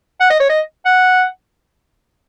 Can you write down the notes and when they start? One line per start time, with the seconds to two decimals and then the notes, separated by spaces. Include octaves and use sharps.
0.20 F#5
0.30 D#5
0.40 C#5
0.49 D#5
0.85 F#5